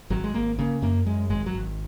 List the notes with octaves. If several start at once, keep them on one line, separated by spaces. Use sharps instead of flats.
G#1 F#3
G#3
G#1 A#3
C#3 A#3
F#2 A#3
F#2 G#3
G#1 G#3
F#3
G#1